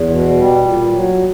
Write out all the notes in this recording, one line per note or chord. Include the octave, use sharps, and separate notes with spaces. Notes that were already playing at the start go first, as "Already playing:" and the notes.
Already playing: E2
B2
G3
A#2
F#3